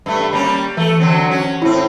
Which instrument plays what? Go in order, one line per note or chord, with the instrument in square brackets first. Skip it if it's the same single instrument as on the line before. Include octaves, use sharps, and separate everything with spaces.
[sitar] G2 A3
G3 A#3 C#4
[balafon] E3 [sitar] A3 A4
[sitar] D3 F#3 C4
C#4 F#4
[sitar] A2 C4 [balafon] E4